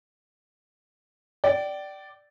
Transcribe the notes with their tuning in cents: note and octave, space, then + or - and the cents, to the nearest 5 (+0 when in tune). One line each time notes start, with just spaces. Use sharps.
D5 +0 G5 -30